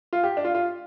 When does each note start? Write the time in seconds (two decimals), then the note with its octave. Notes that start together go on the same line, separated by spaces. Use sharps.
0.13 F4
0.24 G4
0.37 D4
0.45 F4
0.55 F4